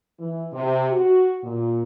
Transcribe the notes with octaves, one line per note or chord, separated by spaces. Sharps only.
E3
C3
F#4
A#2